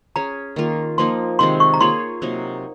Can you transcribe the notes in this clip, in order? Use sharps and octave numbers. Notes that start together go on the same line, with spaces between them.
C#4 G#4 C#5 A#5
D#3 A#3 F4
F3 A#3 D#4 C6
C3 D#3 G#3 C4 C6
C#6
A#5
A#3 F4 G#4 C#5 C6
C3 F#3 A#3 D#4